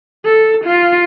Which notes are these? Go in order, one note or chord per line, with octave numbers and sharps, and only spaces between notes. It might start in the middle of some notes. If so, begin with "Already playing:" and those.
A4
F4